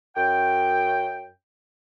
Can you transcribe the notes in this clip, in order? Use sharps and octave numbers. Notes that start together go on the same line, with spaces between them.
F#2 G5